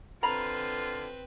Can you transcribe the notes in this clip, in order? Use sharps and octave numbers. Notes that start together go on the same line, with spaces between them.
D3 C4 F4 B4 A#5 B5